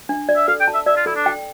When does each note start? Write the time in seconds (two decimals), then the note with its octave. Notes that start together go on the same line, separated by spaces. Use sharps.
0.09 D4
0.29 D5
0.36 E5
0.48 A4 F5
0.60 G5
0.68 A5
0.74 E5
0.86 D5 E5
0.97 F4
1.06 E4 A4
1.16 D4
1.26 G5